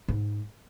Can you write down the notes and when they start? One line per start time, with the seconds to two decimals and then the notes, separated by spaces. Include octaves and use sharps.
0.08 G#2